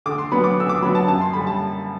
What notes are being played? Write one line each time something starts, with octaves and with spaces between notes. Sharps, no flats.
D3 D6
C6
F#3 B3 D4 B5
D6
D3 E6
D6
F#3 B3 D4 B5
A5
F#2 A5
C6
D3 G3 B5
A5